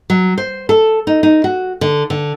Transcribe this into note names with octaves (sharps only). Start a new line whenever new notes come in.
F#3
C5
A4
D#4
D#4
F#4
D3
D3